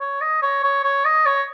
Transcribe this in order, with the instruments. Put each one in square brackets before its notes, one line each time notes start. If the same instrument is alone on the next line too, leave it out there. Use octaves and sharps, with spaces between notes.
[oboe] C#5
D#5
C#5
C#5
C#5
D#5
C#5